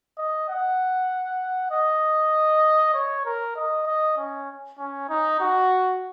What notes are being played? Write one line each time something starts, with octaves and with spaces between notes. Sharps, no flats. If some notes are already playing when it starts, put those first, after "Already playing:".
D#5
F#5
D#5
C#5
A#4
D#5
D#5
C#4
C#4
D#4
F#4